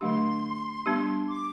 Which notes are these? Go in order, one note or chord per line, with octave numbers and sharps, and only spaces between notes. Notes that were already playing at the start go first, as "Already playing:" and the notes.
D3 F#3 A3 D4 G4 C6
G3 B3 D4 G4
D6